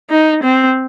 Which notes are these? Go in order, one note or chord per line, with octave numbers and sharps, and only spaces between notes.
D#4
C4